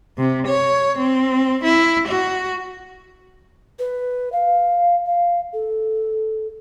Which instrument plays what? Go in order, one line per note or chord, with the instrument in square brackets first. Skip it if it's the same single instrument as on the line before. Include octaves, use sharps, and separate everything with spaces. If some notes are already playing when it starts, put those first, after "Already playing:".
[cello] C3
C#5
C4
E4
F#4
[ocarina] B4
F5
F5
A4